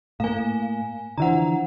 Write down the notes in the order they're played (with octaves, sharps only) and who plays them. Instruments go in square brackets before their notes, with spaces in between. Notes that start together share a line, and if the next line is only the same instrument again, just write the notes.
[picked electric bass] A2 A#3 [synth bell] F5 G#5
[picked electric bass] D3 E3 F3 [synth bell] F#5 A#5